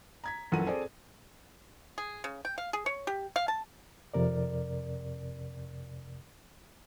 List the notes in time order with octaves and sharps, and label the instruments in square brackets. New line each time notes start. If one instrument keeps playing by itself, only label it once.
[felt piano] A#5 G#6 B6
A#1 F#2 E3 A4 F#5 D#7
C4 G#4 A4 C5 D5
[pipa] G#4
C#3
G5
F5
G#4
C#5
G4
F5
A5
[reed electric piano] F2 C3 A#4 D5